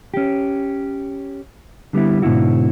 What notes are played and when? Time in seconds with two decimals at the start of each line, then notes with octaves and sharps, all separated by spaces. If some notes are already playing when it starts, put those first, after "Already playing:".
0.14 C#4 G4
1.93 D3 G3 B3 E4
2.22 G#2 B2 D3 E4 F#4